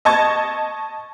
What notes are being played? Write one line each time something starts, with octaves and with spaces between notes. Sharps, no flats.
D#5 A5 C#6 G#6 A6